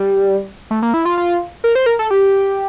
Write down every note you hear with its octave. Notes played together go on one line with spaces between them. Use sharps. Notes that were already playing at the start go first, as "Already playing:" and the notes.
Already playing: G3
A3
A#3
E4
F4
F4
A#4
C5
A#4
A4
G4